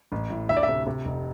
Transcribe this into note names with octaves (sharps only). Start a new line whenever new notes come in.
A1
A2
D2 E5
D5
E5
C3
C3
F1